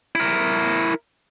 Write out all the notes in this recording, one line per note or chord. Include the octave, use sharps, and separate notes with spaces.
E4 A#4